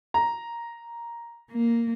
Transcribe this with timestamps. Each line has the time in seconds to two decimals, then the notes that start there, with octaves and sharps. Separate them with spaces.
0.14 A#5
1.51 A#3